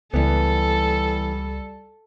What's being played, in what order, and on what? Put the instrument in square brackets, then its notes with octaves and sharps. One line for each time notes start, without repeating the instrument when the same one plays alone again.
[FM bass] C#2 [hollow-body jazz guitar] E3 B3 [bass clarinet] G3 [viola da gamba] A4